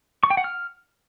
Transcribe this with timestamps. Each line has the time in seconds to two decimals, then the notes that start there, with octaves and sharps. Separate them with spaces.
0.23 C#6
0.30 G5
0.37 F#5
0.44 F6